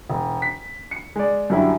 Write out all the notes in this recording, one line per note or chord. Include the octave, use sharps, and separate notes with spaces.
E1
B6
C#7
G#3 D5
F#2 D3 G3 E4 F#4